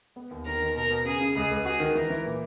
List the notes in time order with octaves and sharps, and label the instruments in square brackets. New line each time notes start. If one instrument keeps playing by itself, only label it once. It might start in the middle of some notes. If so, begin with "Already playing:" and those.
[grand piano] B3
D#2
[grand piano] D#3 [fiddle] A#4
[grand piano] D#3
[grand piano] B2 [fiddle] A#4
[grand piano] B2
[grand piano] C#3 [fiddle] G#4
[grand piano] C#3
[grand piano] C#2 [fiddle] G#4
[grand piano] C#2
[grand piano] F#4 [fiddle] G#4
[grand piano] D#3
[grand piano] E3 [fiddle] A#4
[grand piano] E3
A#2